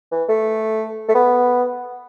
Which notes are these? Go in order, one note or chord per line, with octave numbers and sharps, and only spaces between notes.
E3
A3
A3
B3